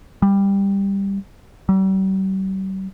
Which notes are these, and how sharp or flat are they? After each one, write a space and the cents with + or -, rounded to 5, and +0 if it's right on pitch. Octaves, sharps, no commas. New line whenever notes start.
G3 +10
G3 -45